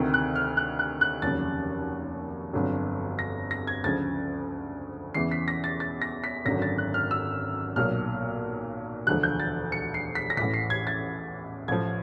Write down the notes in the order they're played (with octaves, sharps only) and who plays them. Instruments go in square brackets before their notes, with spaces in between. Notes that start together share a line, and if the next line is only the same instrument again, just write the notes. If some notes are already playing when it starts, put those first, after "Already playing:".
Already playing: [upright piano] D2 C3 D#3
F#6
F6
F#6
F#6
F#6
F1 D#2 C#3 F#3 A6
G1 F2 D3 F#3
A#6
A#6
G#6
D2 C#3 F3 A6
E2 C#3 E3 C7
B6
A#6
A6
A6
A#6
B6
G#1 F#2 D3 F#3 A#6
A6
F#6
F6
E6
B1 A#2 F#3 F6
E1 D2 D3 F3 F#6
G6
A6
C#7
C7
B6
A#6
A1 A2 E3 B6
C7
G#6
A6
A1 A2 F3 G#6